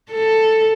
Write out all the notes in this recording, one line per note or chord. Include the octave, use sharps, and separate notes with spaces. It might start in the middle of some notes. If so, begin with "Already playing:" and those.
A4